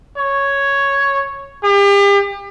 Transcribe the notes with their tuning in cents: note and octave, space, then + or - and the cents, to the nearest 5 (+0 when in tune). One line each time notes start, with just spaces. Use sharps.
C#5 +0
G4 +40